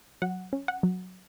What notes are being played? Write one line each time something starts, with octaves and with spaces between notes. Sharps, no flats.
F#3 F#5
C#4
F#5
F#3